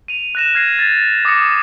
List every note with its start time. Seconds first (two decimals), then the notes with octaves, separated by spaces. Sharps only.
0.08 D#7 F7
0.35 F#6 A#6 E7
0.55 F6 G#6 A#6 C7
0.79 A6
1.25 D6 D#6 A6 A#6 C#7